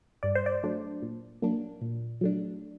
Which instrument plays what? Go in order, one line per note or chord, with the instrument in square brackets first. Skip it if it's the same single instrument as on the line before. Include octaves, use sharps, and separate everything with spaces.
[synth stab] G2 D5
C5
D5
F#3 A3 D4
A#2
F#3 A#3 D4
A#2
F#3 A3 D4